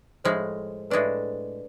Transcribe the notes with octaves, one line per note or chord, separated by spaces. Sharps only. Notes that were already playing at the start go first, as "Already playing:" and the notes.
A2 F3 G#3 C5
A2 G#3 D4 B4 D5